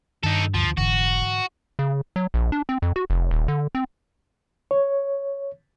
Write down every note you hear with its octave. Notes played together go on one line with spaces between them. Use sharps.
G2 D#3 D#4 A4
D2 F3
F1 G#2 D3 E3 F#4
C#3
F#3
A#1
D4
C4
F2
F#4
F1
D#1
D3
C4
C#5